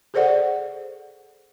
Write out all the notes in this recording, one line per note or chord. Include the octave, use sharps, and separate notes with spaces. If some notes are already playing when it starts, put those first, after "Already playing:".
G#4 A4 C5 D5 F#5